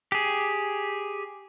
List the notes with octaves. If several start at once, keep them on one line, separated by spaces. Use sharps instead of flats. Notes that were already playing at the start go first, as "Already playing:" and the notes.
G4 G#4